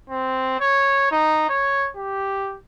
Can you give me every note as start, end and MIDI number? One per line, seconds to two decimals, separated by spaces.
0.10 0.58 60
0.60 1.07 73
1.11 1.46 63
1.49 1.89 73
1.96 2.56 67